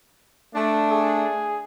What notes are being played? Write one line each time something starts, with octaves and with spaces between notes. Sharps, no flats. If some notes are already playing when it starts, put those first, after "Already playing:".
A3 D4
G#4